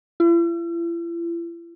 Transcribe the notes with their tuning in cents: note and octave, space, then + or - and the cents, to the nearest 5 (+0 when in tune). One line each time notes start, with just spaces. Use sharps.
E4 +45